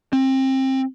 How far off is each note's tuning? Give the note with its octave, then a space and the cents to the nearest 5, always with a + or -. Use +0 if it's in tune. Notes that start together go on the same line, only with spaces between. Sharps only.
C4 +25